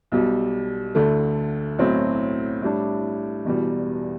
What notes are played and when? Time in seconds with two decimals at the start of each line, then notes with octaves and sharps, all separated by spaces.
0.12 B1 B2 G3
0.95 D2 D3 A3
1.78 B1 A2 F#3 C4
2.62 A2 G3 D4
3.45 E1 E2 B2 G3